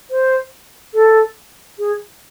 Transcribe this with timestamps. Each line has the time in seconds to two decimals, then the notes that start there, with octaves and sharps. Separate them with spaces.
0.11 C5
0.94 A4
1.79 G#4